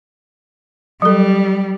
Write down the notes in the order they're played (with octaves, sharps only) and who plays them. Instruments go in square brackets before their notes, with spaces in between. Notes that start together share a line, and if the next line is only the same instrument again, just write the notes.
[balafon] F#3 A4 [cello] G3